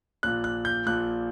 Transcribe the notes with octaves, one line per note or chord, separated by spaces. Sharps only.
A#1 A#2 F#6
F#6
G6
A#1 A#2 F#6